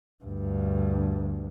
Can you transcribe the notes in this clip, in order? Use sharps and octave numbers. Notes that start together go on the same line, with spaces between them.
D2 G2